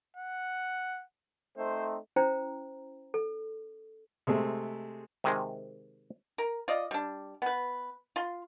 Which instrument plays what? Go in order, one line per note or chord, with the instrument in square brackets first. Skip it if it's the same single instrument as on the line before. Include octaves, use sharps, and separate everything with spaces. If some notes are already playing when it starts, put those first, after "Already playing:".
[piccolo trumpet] F#5
[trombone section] A3 C4 D#4 [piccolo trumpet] C5
[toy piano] C#4 E4 C5 G5 A#5
A4
[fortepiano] C3 G#3 A3
[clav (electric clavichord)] C3 D#3 G#3
[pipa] A#4
F4 D5 D#5
G3 D4
B3 B4
F4 C6